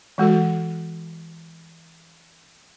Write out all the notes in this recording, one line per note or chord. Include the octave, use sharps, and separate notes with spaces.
E3 G#3 F#4 A4